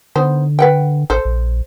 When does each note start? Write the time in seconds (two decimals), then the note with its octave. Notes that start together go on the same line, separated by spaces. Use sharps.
0.16 D3 B3 D#4 C5
0.59 B4 F#5 G5
1.10 A1 A4 C5
1.25 A#1